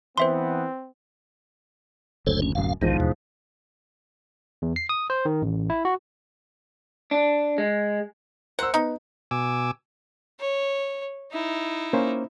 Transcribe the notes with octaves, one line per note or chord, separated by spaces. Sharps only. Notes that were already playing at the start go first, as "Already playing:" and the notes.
E3 B3 C4 C5 E5 C6
F#1 D2 A4 C5 C#5
C#4
D1 F#2 F5
B1 E2 G#2 D#3 F3
D#2 B2
E2
C7
D#6
C5
D#3
A1
E4
F#4
D4
G#3
A#4 C5 F#5 E6
B3 D#4
B2 G#5 D6 E6
C#5
D#4 E4
A#3 C#4 C5